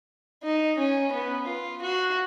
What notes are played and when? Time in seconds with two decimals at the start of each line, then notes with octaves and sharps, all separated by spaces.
0.44 D#4
0.78 C#4
1.12 B3
1.47 F4
1.82 F#4